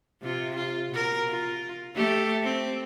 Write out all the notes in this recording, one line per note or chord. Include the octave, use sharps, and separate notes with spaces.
C3 F4
F4
B2 A#4
F4
A3 G4 A4
C4